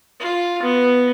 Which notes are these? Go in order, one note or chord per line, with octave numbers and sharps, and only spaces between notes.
F4
B3